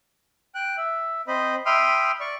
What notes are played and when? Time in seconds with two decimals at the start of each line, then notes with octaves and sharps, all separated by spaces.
0.55 G5 F#6
0.77 E5
1.28 C4 C5 D#5 B5
1.66 E5 G5 B5 C6 D#6 F6
2.20 D5 C#6